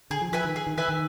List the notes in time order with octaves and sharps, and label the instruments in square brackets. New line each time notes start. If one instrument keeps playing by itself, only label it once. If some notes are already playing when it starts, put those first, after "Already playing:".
[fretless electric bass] D3 [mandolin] G#4
[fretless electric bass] F3
[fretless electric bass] F3 [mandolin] B4 E5 G#5
[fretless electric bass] D#3
[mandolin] G#4
[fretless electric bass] D#3
[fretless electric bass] E3 [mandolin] B4 E5 G#5
[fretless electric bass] D#3